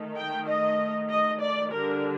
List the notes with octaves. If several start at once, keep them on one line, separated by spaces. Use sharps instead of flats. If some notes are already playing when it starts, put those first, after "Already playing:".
Already playing: D#3 A3 D#4
G5
D#5
D#5
D5
D3 G3 D4 A#4